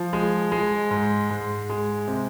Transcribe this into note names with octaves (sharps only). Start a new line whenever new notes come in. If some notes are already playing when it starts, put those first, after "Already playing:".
Already playing: F3
G#3
G#3
G#2
G#2
G#3
C3